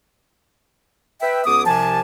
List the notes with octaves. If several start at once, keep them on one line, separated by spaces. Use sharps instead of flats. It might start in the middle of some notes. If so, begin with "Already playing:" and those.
B4 E5 G5
C#2 B3 D6 D#6
C2 C3 F3 G#5 A5